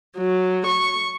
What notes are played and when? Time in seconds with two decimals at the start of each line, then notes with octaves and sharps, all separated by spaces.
0.17 F#3
0.65 C#6